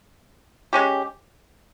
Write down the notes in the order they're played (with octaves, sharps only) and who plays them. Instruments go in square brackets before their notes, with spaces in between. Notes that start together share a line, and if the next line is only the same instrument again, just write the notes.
[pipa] G#3 C#4 G4